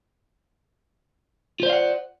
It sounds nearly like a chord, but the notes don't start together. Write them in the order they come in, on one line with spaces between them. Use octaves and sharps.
F4 C5 D5 F5 F#5